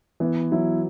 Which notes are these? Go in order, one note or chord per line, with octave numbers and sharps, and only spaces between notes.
E3 B3
F#3 E4